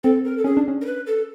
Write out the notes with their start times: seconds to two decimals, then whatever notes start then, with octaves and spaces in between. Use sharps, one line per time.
0.04 C4 A4
0.24 A#4
0.38 A4
0.44 C#4 G#4
0.57 D4
0.68 C#4
0.81 A#4
0.86 B4
1.07 A4